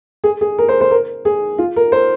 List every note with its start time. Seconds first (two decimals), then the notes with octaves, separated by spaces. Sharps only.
0.24 G#4
0.41 G#4
0.58 A#4
0.69 C5
0.81 C5
0.91 A#4
1.25 G#4
1.58 F4
1.76 A#4
1.92 C5